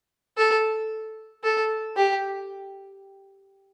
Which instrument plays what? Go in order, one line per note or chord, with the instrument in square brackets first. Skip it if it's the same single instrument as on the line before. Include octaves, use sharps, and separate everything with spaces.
[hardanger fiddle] A4
A4
G4